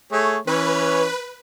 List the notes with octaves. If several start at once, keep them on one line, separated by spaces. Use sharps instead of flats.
A3 G#4 C#5
E3 C#4 B4 C#5